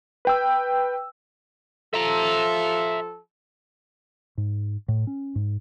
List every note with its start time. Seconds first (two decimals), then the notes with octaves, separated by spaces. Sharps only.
0.25 B4 G5 E6
1.94 F3 F4 A4 E5 A#5
4.38 G#2
4.88 A2
5.07 C#4
5.35 G#2